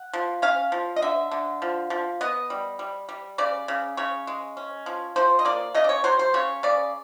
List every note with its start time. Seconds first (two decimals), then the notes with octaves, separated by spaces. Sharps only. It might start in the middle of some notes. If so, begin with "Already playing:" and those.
Already playing: F#5
0.13 F3
0.42 C#4 F5
0.72 F3
0.96 D#5
1.02 D3 E5
1.31 D3
1.62 F3
1.90 F3
2.21 B3 D#5
2.50 G3
2.79 G3
3.09 G3
3.38 C#3 D5
3.68 C#3
3.97 C#3 C#5
4.27 G#3
4.57 C#4
4.86 F3
5.16 F3 C5
5.39 D#5
5.45 A#3 D5
5.74 C#3 D#5
5.84 D5
5.89 C#5
6.04 F#3 C5
6.19 C5
6.34 C#3 C#5
6.63 C#3 D5